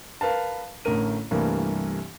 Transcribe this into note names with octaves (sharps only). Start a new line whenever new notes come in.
A#4 B4 F5 A5
A1 D3 A3 A#4 D#7
C2 G2 E3 A3 A#3